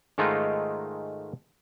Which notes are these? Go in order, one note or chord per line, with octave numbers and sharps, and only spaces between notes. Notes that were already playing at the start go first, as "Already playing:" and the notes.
G#2 D#3 G#3 A3 D#4 F4